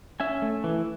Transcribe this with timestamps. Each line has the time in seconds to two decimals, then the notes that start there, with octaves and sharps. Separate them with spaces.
0.20 C#4 E5 G#5
0.42 A3
0.64 E3